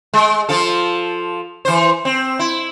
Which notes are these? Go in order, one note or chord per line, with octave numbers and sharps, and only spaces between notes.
G#3
F3 F4 A4
E3 C5
C4
E4